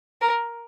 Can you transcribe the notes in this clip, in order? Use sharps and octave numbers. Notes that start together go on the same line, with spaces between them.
A#4